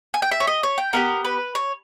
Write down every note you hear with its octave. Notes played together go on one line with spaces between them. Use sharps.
G#5
G5
E5
C#5
D#5
C#5
G5
B3 D#4 G4 A#4
B4
C#5